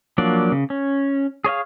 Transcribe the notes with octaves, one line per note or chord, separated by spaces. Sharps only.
F3 F#3 A#3 D4 D5
C#3
C#4
G#4 C#5 D#5 F5